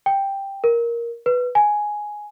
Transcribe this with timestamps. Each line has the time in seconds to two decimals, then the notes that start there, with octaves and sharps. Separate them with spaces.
0.06 G5
0.64 A#4
1.26 B4
1.55 G#5